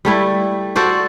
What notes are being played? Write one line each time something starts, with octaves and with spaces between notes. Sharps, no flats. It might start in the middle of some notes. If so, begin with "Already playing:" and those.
G3 A3 E4
F#4 A4 C5 D5